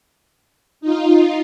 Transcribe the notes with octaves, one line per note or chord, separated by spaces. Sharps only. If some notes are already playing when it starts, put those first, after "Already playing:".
D#4 F4